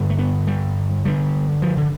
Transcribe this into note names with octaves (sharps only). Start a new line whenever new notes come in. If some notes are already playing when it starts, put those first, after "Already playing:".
Already playing: G2 D3
A3
B3
G3
G2 D3 G3
F3
D3